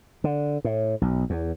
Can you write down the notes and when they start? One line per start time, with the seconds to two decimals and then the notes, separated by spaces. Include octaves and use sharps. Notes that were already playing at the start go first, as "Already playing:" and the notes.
0.24 D3
0.64 A2
1.02 B1
1.30 E2